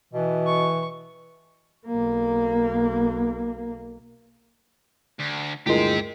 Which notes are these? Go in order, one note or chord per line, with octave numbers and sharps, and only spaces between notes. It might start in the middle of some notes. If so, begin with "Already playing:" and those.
B2 E3
C#6
B1 A#3
D2
D2 G2 G#3 E4 F4 G4 A#4 C5